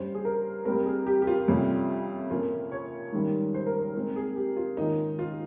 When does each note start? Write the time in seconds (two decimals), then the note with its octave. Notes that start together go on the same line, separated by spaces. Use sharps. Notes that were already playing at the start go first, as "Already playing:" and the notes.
Already playing: G2 G3 C#4 C5
0.15 G#4
0.25 A#4
0.65 G2 G3 C4 A#4
0.86 G#4
1.07 G4
1.22 G4
1.27 F4
1.48 F2 C3 G3 C#4
2.30 A#2 F3 A#3 C#4 F4
2.72 C#5
3.12 G#2 D#3 G3 A#3 C#4
3.54 C5
3.66 A#4
3.79 C5
3.95 A#2 G#3 C4 A#4
4.16 G#4
4.36 G4
4.57 F4
4.77 G#2 D#3 A#3 C#4 D#4
5.19 F4